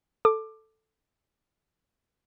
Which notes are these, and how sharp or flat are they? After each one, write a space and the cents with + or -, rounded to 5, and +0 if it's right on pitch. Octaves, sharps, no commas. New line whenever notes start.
A4 +0 D6 +15